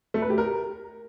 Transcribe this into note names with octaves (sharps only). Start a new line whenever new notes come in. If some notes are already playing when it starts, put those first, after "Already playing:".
A3
B4
G4
A#4